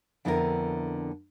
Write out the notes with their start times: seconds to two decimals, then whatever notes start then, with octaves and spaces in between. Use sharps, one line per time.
0.25 F2 D3 B3 E4 F#4 A#4